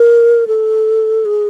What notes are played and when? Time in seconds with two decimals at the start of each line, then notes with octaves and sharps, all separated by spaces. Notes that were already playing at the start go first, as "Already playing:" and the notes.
Already playing: A#4
0.48 A4
1.25 G#4